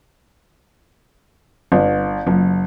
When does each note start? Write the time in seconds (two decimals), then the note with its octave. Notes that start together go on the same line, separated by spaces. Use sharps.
1.72 G1
2.27 F#1